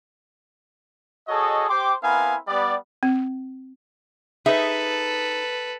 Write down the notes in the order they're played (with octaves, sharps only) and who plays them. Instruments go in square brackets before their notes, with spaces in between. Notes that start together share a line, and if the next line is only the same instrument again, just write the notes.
[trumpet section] F#4 G#4 A4 C#5 D#5
G4 C5 G5 C6 D6
B3 C4 E4 A#4 F5 G#5
G3 B3 D5
[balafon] C4
[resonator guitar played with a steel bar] D#4 G#4 E5 [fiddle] A4 B4